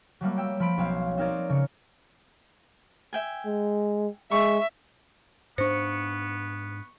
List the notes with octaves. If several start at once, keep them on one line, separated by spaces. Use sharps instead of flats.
F#3 G3 A3 A#3
G5 E6
F3 B5 D7
B1 C4 C#5 F5
C4 D#4 A#4 C#5 D5
C#3 C#7
E5 G5 G#5
G#3
G#3 E5 C#6
G#2 B3 D4 C5 C#6 C#7